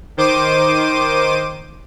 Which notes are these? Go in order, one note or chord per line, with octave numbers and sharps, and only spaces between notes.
D#3 C5 D6 D#7